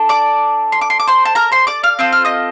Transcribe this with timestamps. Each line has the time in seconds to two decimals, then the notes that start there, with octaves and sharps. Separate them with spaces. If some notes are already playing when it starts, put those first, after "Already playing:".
Already playing: D4 A4
0.09 D5 D6
0.72 C6
0.81 D6
0.90 C6
1.00 D6
1.07 C5 C6
1.25 A5
1.35 A#4 A#5
1.52 C5 C6
1.67 D5 D6
1.83 F5 F6
1.99 C4 F4 A4 D#6
2.12 F6
2.25 D#5 D#6